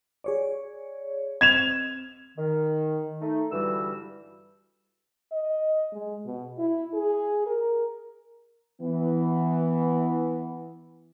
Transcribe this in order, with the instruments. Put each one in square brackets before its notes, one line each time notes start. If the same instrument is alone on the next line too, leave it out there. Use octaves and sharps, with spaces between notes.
[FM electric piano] G#4 C#5 D5
[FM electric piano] C4 D#5 [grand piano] G#6 E7 F7
[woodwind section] D#3
A3 D#4
G2 D3 E3 G3 F#4 E6
[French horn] D#5
G#3
B2
E4
G#4
A#4
[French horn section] E3 B3